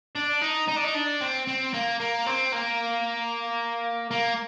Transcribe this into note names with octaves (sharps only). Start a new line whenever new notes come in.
D4
D#4
D#4
D4
D#4
D4
C4
C4
A#3
A#3
C4
A#3
A#3